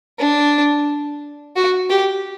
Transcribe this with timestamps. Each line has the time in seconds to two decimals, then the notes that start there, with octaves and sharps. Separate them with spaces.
0.19 D4
1.56 F#4
1.90 G4